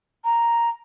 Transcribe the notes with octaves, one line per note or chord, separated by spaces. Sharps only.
A#5